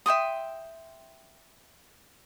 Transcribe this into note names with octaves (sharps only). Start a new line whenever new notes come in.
E5 G5 C6 D#6